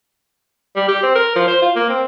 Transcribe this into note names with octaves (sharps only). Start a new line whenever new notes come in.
G3
G4
C4
A#4
F3
C5
F4
A#3
C4